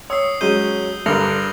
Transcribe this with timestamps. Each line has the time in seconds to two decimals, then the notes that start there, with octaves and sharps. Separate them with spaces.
0.10 C#5 D#6 E6 C7
0.41 F#3 G#3 C#4 G6 D#7 G7
1.06 G2 D3 A#4 A#6 F7 F#7